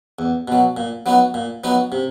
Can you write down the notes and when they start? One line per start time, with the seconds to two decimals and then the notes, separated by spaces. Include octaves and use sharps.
0.19 E2
0.48 B2 F#3
0.77 A#2
1.06 F#3 B3 D#4 F#4
1.34 A#2
1.64 F#3 B3 D#4 F#4
1.92 C3